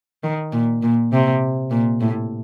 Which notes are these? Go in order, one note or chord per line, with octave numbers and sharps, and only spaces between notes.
D#3
A#2
A#2
C3
A#2
A2